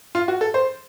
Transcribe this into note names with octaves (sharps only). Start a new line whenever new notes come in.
F4
F#4
A4
C5